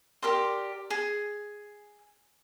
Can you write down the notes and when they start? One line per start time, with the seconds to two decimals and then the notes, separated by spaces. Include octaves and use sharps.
0.22 G4 A#4 D5 C6
0.90 G#4